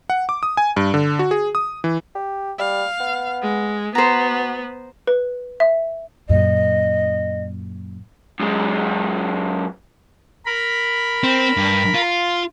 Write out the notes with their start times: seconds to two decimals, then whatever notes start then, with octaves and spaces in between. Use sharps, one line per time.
0.10 F#5
0.29 D6
0.43 D#6
0.57 G#5
0.77 G2
0.94 D3
1.19 F#4
1.31 G#4
1.55 D#6
1.84 E3
2.15 G4
2.59 G3 F5
3.00 B3
3.42 G#3
3.95 B3 F#4 C5 A#5
5.07 B4
5.60 E5
6.29 F#2 A#2 D#5
8.40 F#2 G#3
10.46 A#4 B5
11.24 C4
11.57 G2
11.94 F4